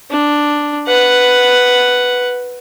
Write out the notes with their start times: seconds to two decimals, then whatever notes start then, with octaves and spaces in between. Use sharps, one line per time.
0.10 D4
0.87 B4 F#5